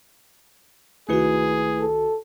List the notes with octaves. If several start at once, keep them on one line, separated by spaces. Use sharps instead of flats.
C2 D#3 A3 E4 F#4 G#4 B4
A4